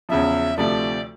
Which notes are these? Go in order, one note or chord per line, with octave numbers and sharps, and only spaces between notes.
E2 C#3 F3 E5
D2 C3 F3 A3 D5